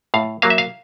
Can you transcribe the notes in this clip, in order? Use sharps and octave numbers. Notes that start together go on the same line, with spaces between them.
A2 F5
F#3 A#3 F5
E5
F5